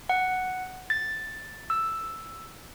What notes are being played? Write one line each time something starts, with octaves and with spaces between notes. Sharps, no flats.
F#5
A6
E6